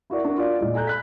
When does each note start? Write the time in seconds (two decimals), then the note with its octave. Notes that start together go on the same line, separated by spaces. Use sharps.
0.10 E4 F#4 A#4 D5
0.25 D4 F#4 A#4
0.37 F4 D5
0.59 A#2 G#3 D5
0.74 A4 G#5 A#5 F#6 G6
0.87 B5 F#6 B6